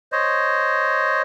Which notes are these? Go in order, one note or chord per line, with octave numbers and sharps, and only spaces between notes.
C5 C#5 D#5